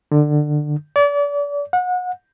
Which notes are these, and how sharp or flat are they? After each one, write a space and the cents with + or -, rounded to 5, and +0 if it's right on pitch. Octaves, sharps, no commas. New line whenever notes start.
D3 +20
D5 -35
F#5 -30